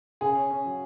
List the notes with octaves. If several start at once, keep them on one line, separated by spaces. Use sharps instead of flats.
C#3 G#4
C#4
C#4
F#3